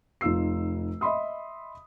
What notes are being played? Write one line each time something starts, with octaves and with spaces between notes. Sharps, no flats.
F1 D#4 F4 E6 C7
D#5 E5 B5 C6 D#6